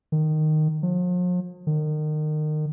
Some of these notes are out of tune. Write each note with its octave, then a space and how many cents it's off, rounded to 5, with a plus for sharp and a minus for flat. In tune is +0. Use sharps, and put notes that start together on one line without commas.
D#3 -10
F3 +45
D#3 -30